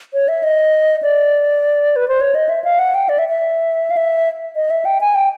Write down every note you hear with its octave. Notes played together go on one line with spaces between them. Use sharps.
C#5
E5
D#5
D5
B4
C5
C#5
D#5
E5
F5
F#5
G5
D5
E5
E5
F5
E5
D#5
E5
G5
G#5
G5